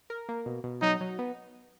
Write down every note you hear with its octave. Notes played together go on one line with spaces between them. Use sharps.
A#4
A#3
B2
B2
F#3 D#4
F#3
B3